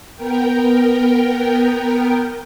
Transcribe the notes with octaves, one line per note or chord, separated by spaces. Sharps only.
B3 A#4 G5